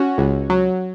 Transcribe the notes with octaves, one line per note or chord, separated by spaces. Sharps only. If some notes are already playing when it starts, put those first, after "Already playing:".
Already playing: C#4 F#4
C#2
F#3